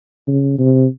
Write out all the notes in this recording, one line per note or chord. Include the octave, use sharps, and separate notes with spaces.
C#3
C3